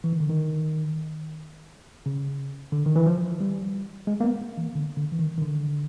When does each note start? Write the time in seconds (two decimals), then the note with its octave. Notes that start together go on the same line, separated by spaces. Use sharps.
0.04 E3
0.13 D#3
0.20 D3
0.29 D#3
2.06 C#3
2.72 D3
2.86 D#3
2.96 E3
3.06 F3
3.40 G3
4.07 G#3
4.20 A#3
4.24 B3
4.41 A#3
4.58 E3
4.75 D3
4.97 D3
5.12 E3
5.19 D#3
5.37 D#3
5.42 D3